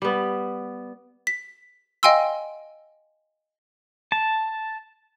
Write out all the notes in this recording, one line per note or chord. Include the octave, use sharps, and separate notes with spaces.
G3 B3
B6
D#5 F5 G5 G#5 C6 E6
A5